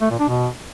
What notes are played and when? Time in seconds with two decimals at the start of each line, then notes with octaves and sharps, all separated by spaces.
0.01 A3
0.10 A#2
0.19 D4
0.28 B2